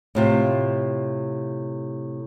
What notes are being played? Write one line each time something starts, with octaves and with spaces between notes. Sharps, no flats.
A2 C3 F4